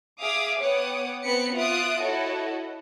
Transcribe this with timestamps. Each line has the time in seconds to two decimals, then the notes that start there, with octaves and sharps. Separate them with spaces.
0.20 G#4 E5 F5 D6 D#6
0.60 B3 C#5 F#5 G5 D6 D#6
1.24 B3 C4 B4 B5 B6 C#7
1.54 F4 E5 D#6 F#6 D7
2.01 E4 F#4 A4 C#5 D#5